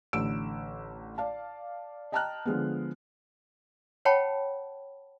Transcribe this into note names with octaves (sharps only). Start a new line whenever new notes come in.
A1 D3 E6 D7
D5 F5 A5
D#5 G5 A5 A#5 F6 F#6
D3 F3 G#3 B3
C#5 F#5 G5 A5 B5 C#6